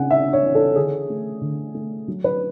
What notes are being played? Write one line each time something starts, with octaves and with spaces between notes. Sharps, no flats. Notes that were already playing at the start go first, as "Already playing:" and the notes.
Already playing: C#3 F#5 G#5
D4 E5
C#5
E3
A4
D3 G#4
A3
D3
A3
F#3
B4